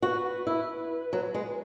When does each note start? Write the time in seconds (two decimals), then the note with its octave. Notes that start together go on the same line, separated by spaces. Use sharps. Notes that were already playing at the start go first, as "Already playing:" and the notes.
0.02 F#4 B4
0.47 E4
1.13 F#3
1.34 G#3